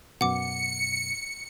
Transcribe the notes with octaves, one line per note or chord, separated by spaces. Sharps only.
F#2 B2 F#5 D6 C#7